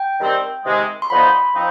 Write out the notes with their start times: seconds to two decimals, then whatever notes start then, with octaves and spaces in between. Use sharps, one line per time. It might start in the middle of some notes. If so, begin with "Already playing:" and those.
Already playing: G5
0.20 D#3 G3 C4
0.65 C3 D#3 G#3
1.02 C6
1.10 D3 F3 B3 D#4 B5
1.55 F3 C4 D#4